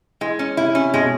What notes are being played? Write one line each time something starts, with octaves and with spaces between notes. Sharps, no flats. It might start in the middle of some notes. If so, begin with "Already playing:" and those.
E3 G#3
C#4
C3 E4
C#4
B2 G#3